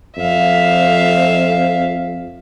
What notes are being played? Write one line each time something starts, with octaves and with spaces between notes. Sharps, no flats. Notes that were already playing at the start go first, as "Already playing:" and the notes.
F2 E5 F5